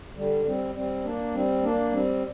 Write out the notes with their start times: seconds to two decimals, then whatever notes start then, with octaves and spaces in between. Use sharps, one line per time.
0.16 D3 G3
0.46 G3 C4
0.75 G3 C4
1.04 A#3 D4
1.34 G3 C4
1.63 A#3 D4
1.92 G3 C4